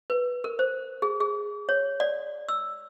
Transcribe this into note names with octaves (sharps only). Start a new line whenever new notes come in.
B4
A#4
C5
G#4
G#4
C#5
D5
E6